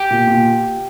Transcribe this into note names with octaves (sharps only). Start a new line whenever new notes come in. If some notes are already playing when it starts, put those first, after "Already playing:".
Already playing: G4
A#2
A#2